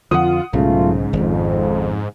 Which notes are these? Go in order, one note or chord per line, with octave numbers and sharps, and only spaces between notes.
F2 D3 F3 F4 F#5 D#6
B1 G#2 C#3 F#3 A3 F4
G#1 F2